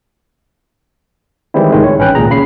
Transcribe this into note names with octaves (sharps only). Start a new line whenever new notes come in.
D#3 E3 G3 G#3 C4 E4
C#2 A2 D#3 G#3
C#5
A1 C#4 B4 G5 F#6
G#1 C#2 A#2 G#4 A#5
C#3 B5 C7